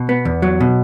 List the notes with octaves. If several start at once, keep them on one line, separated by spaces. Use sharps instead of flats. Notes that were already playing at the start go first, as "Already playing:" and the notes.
Already playing: B2
B3
E2
F#3
B2